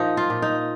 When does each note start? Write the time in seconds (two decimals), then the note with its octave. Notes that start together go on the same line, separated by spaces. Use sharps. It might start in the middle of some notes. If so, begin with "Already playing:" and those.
Already playing: A#2 F3 A#3 D#4
0.17 F4
0.30 A#2
0.42 D#4